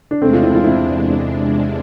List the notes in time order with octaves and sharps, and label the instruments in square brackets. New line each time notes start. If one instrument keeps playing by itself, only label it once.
[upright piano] D4
[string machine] E2 C3 G#3 D4 [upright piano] A3 C4
[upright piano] F4
C4 E4
F4
C4 E4